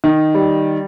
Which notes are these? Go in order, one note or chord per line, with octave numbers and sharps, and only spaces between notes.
D#3
G3